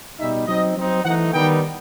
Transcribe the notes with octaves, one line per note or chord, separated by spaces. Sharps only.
B2 G3 D#4 E5
F#3 C4 D#4 D#5
F#3 C4 D#4
E3 A3 D#4 F#5
D#3 G3 B3 D#4 G5